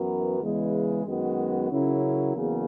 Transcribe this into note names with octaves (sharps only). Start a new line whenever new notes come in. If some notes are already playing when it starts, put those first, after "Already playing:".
Already playing: F#2 E3 B3 F#4 A#4
E2 C#3 E3 G#3
F#2 D#3 G#3 B3 F#4
C#3 F#3 C#4 E4 A#4
E2 C#3 F#3 A#3